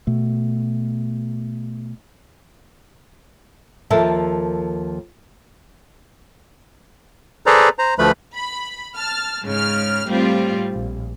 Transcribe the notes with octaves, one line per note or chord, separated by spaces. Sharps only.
B2 A3
D#2 F3 A4 A#4 E5
G#4 A4 B4 C5 D5 A#5
C5 A#5
D2 F3 A3 B4 B5
B5
A5 F6
G#2 C#3 F6
A2 G3 C4 F4
A#1